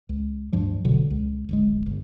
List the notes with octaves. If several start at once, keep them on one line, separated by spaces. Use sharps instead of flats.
C#2
D2 G2 F3 G3
E1 B2 D3 F#3
C#2
D1 G#1 G#3
G1